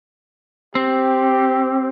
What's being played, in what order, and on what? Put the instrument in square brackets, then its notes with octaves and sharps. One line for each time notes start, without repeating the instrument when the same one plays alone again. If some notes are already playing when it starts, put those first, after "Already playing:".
[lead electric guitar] C4 [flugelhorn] G4